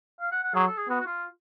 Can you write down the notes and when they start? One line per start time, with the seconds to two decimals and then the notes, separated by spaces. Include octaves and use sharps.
0.20 F5
0.32 F#5
0.43 F#5
0.54 F#3 G#4
0.66 A4
0.77 G#4
0.89 B3 F#4
1.00 F#4
1.06 F4